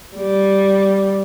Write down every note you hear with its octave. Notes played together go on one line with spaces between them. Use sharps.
G3